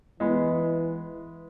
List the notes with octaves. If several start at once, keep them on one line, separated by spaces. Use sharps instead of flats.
E3 G#3 B3